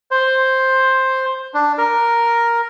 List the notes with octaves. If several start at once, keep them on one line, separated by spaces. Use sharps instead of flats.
C5
D4
A#4